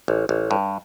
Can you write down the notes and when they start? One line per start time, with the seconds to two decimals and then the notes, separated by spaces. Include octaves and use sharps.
0.08 A1
0.29 A1
0.51 G2